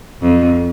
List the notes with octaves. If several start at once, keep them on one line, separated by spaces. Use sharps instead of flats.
F2